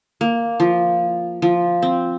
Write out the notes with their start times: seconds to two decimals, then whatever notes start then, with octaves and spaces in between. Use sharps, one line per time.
0.21 A#3
0.60 F3
1.42 F3
1.82 C4